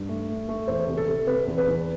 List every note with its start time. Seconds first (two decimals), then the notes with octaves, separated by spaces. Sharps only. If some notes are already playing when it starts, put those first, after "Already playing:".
Already playing: G2
0.09 A3
0.29 A3
0.49 A3
0.67 E2 C5
0.88 C3
0.97 A4
1.08 C3
1.27 C3 B4
1.47 E2
1.58 B4
1.67 E2